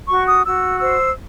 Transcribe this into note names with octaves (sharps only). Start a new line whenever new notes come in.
F#4 C#6
D#6
F#4 E6
C5 E6